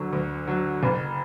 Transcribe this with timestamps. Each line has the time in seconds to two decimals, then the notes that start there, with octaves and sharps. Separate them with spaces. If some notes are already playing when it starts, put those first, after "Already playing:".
Already playing: D2 D3 F#3
0.13 D2
0.47 D3 F#3
0.83 F#1